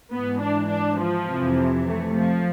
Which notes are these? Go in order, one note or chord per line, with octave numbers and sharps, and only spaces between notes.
G#2 E3 B3
D4
D4
F3
F2 C3 E3
A3
F3